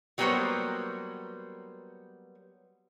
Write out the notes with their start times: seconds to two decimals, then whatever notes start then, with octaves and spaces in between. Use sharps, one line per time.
0.18 F#3 G3 A#3 B3 C5 C#5